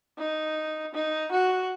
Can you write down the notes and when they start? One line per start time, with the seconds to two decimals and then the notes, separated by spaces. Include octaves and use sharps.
0.18 D#4
0.94 D#4
1.31 F#4